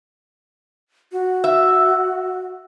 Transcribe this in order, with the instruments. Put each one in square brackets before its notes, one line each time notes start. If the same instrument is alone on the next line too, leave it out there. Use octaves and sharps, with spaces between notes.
[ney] F#4
[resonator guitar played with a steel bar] E5